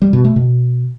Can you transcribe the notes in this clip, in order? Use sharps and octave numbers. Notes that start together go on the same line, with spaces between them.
G3
B2
A3
B2